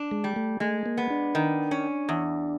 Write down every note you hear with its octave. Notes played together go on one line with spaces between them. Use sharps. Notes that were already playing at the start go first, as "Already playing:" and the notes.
Already playing: D4
G#3
G3
A3
G#3 A3
A#3
B3
D4
D#3
C#4
E2